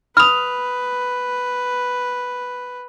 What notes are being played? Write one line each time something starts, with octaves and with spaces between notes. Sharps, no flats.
B4 B5 D#6 F6 F7